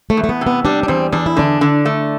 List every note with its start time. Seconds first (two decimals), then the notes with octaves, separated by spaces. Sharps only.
0.10 A3
0.17 E2
0.24 A3
0.29 B3
0.41 C3
0.47 B3
0.65 G3 D4
0.83 D4
0.88 E2 C4
1.12 E2 D4
1.26 E4
1.37 D3 D4
1.61 D3
1.85 A3